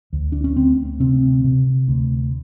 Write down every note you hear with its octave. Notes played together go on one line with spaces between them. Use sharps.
D2
D4
C#4
D2 C4
C3 C4
C3
D2